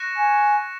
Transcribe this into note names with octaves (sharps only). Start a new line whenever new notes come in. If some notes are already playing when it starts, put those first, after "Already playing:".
Already playing: C#6 F#6 A#6 C#7 E7
G#5